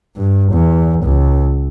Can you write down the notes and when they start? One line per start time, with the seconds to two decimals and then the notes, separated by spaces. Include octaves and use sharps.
0.16 G2
0.52 E2
1.04 C#2